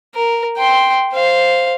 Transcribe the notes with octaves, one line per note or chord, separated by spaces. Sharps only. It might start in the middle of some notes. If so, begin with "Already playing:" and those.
A#4
G5 C6
C5 F5